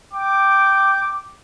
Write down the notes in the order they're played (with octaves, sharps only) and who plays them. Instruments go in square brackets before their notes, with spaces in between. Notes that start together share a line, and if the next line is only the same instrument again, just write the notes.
[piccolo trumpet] G5 [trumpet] D6